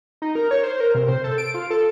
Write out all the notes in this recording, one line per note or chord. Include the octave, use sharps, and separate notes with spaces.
D#4
A#4
C#5
C5
A#4
C3
C5
A4
D7
F4
A4